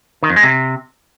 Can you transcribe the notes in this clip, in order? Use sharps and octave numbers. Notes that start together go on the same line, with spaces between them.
D#3
F2
G#3
C3